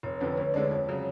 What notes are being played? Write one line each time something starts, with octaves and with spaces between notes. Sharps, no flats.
F1 C#5
F2 D3 B4
D2 C#5
D3 G#3 D4
F2 C#5
C#3 F#3